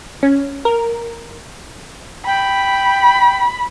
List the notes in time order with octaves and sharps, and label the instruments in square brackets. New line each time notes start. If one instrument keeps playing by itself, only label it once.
[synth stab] C#4
A#4
[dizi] G5 [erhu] B5